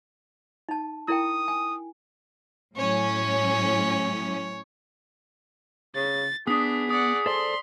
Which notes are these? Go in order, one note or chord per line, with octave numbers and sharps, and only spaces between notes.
D#4 A5
E4 A#4 G5 D#6
G#5
A2 F#3 C#4 C#5
C#3 A6
B3 D4 G#4 D#6 B6
D5 F#5 D#6
A4 C5 D5 C6